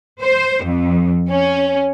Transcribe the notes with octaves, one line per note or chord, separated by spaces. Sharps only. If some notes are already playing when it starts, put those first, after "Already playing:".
C5
F2
C#4